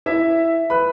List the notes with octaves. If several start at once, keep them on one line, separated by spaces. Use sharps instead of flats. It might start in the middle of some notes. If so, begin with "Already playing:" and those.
E4 E5
B4 B5